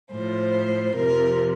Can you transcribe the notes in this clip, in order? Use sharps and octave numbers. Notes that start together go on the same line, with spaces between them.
A2 F3 C5
F2 C3 F3 A#4